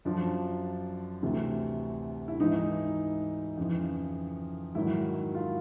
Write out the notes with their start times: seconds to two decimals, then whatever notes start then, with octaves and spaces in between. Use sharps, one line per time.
0.05 F#2 D3 F3 D4
1.22 D2 C3 E3
2.28 E4
2.40 G#2 E3 D#4
3.57 F2 C#3 E3
4.75 G#2 D#3 F#3 E4
5.35 F4